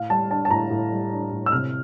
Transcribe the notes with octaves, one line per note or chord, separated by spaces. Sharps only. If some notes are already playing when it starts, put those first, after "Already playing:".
Already playing: A2 F5
G3 A5
D4 A5
A5
A2 A#5
A2
G3
D4
A2
E6
C3 F6